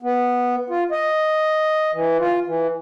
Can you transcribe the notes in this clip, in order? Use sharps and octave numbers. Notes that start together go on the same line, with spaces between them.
B3
F4
D#5
E3
F4
E3